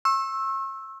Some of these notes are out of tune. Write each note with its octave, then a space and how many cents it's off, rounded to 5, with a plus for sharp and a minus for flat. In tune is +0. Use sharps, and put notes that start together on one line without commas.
C#6 -40 E6 +0